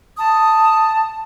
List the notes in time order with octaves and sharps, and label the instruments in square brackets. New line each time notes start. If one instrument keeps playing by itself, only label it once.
[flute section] A5 D#6